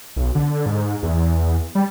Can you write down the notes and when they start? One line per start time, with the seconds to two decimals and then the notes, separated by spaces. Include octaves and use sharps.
0.16 B1
0.35 D3
0.66 G#2
1.03 E2
1.75 G3